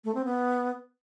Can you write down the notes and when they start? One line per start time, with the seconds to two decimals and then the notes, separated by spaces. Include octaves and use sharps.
0.04 A3
0.15 C4
0.25 B3